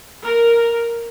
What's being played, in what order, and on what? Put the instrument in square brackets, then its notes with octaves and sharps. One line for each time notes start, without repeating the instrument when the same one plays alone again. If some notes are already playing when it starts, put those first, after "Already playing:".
[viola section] A#4